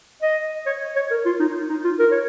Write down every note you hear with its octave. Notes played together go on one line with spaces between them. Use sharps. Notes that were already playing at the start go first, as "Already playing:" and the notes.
D#5
C#5
C#5
A#4
F4
D#4
D#4
F4
A#4
C#5